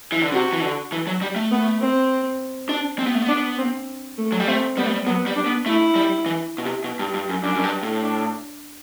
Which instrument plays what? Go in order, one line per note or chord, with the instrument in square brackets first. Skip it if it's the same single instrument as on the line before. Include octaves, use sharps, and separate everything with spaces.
[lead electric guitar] E3
D3
[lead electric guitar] C3 [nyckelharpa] F#4
[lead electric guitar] E3
D3
E3
F#3
G3
A3
[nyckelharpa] B3
C4
[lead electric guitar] D4
C4
B3
A3
B3
[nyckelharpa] D4
C4
A3
[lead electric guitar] F#3
G3
[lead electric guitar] A3 [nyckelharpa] C4
[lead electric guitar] G3 [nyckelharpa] B3
[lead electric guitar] A3
G3
[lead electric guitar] F#3 [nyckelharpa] B3
[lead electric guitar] G3
[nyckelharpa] D4
[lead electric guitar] B3
[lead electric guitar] A3 [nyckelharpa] E4
[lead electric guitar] G3
E3
B2
C3
B2
G2
G2
F#2
[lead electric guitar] F#2 [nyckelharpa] D4
[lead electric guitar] F#2
G2
A2
[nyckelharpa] D4